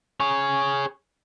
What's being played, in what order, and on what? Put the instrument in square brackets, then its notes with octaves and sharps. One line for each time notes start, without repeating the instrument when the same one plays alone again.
[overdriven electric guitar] G#4 C#5